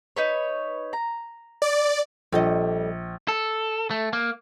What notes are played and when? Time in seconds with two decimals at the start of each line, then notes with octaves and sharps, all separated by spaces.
0.16 D#4 B4 C#5
0.93 A#5
1.62 D5
2.32 A#1 G3 A4 D#5
3.28 A4
3.91 A3
4.13 A#3